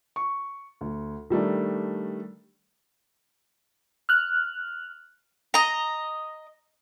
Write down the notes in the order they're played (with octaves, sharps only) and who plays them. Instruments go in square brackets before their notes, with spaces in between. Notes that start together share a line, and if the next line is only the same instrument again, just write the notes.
[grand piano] C#6
D2
D#3 G3 A3 D4
[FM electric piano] F6 F#6
[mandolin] D#5 A#5